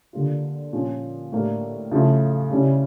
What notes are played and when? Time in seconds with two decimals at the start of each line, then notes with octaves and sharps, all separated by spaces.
0.13 D3 G3 A#3 D4 F4
0.73 A#2 F3 C#4
1.32 A2 G3 A#3 D4
1.91 C#3 F3 A3 E4
2.50 C#3 G3 C#4 E4